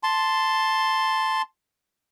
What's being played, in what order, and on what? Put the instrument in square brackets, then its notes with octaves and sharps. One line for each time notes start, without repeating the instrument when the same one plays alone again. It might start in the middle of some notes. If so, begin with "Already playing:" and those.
[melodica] A5 C6